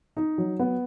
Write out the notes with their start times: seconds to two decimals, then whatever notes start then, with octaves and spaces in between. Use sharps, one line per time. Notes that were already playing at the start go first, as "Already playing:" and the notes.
0.17 D#4
0.38 F#3
0.59 B3